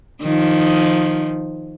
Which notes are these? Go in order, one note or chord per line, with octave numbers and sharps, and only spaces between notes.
D#3 F3